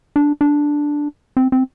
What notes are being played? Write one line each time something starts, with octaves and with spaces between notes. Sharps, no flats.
D4
D4
C4
C4